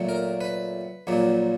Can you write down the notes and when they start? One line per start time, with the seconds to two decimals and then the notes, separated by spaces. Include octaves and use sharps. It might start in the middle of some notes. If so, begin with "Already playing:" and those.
Already playing: A#2 F#3 A3
0.09 A#4
0.41 B4
1.07 A#1 A#2 F#3